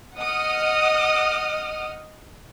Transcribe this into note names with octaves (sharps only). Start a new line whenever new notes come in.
D#5 F#5 D#6 F6